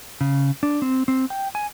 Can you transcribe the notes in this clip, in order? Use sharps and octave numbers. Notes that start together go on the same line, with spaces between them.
C#3
D4
C4
C4
G5
G#5